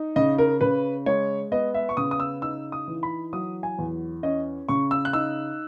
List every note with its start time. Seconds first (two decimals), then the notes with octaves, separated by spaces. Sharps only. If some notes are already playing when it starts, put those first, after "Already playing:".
Already playing: D#4
0.16 C#3 D#5
0.38 A#4
0.61 C#3 B4
1.06 G#3 C#5
1.52 B3 D#5
1.74 E5
1.89 C#6
1.97 C#3 D#6
2.11 D#6
2.20 E6
2.42 D#4 E6
2.72 D#6
2.88 E3
3.03 B5
3.33 F#3 D#6
3.63 G#5
3.79 E2
4.23 C#4 D#5
4.69 C#3 C#6
4.91 E6
5.05 F#6
5.13 D#4 E6